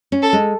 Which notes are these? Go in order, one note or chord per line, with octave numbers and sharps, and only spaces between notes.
C#4
A4
G#3